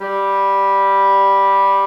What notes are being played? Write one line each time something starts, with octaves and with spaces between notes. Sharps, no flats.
G3